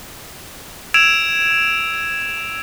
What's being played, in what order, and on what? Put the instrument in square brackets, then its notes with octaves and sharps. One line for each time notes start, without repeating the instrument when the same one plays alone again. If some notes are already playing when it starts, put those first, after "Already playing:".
[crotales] E6 G#6 D7 E7 F7